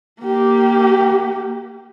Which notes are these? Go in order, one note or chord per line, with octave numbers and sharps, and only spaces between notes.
A#3 G4